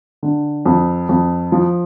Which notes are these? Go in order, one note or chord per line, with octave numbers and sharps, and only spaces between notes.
D3
F2
F2
F3